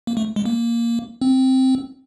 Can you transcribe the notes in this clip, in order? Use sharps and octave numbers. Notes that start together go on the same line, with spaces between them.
A#3
A3
G#3
A#3
C4